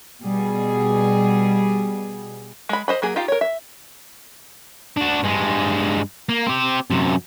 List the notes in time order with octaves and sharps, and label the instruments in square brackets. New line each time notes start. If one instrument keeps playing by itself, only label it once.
[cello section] B2 G3 G#4
[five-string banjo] G#3 B5
C5 D#5 B5
F#3 A#3 G#4
D#4 F4 G4 F5
A#4 C#5
E5
[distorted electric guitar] D4 F#4
G2 G#3
A#3
C4 G4
F#2 C3